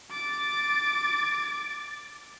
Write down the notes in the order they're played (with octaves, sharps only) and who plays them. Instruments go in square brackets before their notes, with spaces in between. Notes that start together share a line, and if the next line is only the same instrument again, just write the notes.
[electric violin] D6 A6